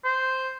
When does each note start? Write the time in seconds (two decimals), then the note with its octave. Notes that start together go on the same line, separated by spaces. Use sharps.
0.04 C5